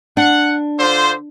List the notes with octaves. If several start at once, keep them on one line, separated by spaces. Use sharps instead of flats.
D4 F#5
D3 F4 C5